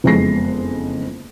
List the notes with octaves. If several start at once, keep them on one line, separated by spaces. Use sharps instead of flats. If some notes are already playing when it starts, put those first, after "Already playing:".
F#1 F2 G#3 B3 A#6 C7